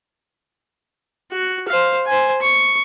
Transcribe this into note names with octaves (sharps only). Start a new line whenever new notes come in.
F#4
C5 F5
C5 G#5
C#6